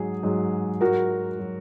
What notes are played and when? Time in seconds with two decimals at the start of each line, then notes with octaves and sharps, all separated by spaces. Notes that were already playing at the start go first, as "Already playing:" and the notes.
Already playing: G#2 F#3 G#4
0.23 G#2 F#3
0.81 G#2 F#3 F#4 A#4
1.39 F#3